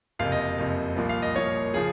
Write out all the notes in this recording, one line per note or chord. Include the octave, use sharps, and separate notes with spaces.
F#1 F2 C3 F5
D#5
F#1 F2 C3
C2 A#2 F3
F5
D#5
C2 A#2 F3 C#5
C#3 F3 G#4